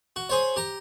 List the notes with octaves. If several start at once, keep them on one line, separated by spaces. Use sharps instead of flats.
F#4
G#4 C5 C#5
G4 A#5